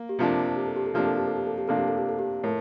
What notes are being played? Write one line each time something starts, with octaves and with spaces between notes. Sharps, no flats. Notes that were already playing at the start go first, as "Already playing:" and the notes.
Already playing: A#3
G4
C3 F3 A#3 D4 F4
G4
A4
G4
A4
C3 F3 A#3 D4 G4
A4
G4
A4
G4
A4
G4
C3 F3 A#3 D4 A4
G4
A4
G4
A4
G4
A2 A#4